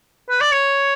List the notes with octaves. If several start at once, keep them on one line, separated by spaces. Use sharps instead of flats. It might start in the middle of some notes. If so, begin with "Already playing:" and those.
B4
D5
C#5